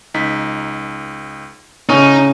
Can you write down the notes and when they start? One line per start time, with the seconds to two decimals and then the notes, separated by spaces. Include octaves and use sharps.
0.14 C#2 D#4 B6
1.89 A2 C#3 C#4 D#4